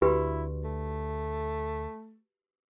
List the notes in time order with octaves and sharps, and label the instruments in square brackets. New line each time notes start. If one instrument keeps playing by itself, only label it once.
[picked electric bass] D2 [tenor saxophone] E4 [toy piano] F#4 G4 B4
[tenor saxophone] A3